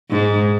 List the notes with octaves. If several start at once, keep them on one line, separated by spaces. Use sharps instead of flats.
G#2